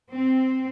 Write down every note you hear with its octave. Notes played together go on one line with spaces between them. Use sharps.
C4